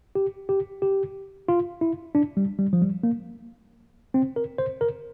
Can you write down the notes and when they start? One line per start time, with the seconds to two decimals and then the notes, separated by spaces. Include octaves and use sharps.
0.15 G4
0.49 G4
0.82 G4
1.48 F4
1.81 E4
2.15 D4
2.37 G3
2.59 G3
2.73 F3
2.82 G3
3.03 A#3
4.14 C4
4.36 A#4
4.58 C5
4.81 A#4